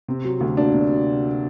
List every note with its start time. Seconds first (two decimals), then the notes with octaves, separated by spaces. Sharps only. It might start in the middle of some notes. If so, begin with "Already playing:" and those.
0.08 C3 C4
0.24 F#3
0.41 D2
0.57 A#3 D4
0.74 C3